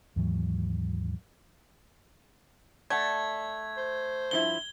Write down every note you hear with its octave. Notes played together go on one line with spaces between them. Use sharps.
D#2 G#2 E3 F#3
A3 D5 F#5 G#6
C5
G2 F3 E4 G7